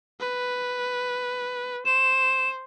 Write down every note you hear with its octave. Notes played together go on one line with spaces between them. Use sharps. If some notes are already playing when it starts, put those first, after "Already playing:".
B4
C5 E7